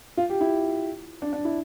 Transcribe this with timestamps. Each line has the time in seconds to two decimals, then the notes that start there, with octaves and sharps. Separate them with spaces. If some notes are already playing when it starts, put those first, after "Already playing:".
0.17 F4
0.30 G4
0.41 E4
1.22 D4
1.33 D4
1.45 E4